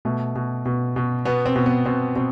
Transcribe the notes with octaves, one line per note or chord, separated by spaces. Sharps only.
B2 A3
B2
B2
B2
B2 B3
C4
B2
B3
B2 C4
B2 C4